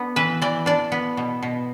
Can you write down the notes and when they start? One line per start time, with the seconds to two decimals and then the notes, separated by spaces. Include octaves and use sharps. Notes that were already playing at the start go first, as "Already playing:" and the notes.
Already playing: B3 D4
0.16 E3 B4
0.42 E3 D5
0.66 D4 D5
0.92 B3
1.17 B2
1.43 B2